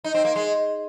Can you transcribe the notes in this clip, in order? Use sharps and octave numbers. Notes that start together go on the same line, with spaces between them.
D#4
C4
A#3
G#3